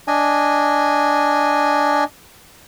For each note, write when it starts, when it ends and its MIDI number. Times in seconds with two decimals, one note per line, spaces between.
0.08 2.04 62
0.08 2.04 75
0.08 2.04 80